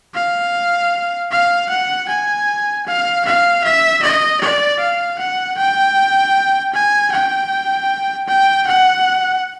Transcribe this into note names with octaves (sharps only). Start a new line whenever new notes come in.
F5
F5
F#5
G#5
F5
F5
E5
D#5
D5
F5
F#5
G5
G#5
G5
G5
F#5